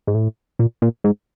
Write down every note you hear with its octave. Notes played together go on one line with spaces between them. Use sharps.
G#2
A2
A#2
A#2
G#2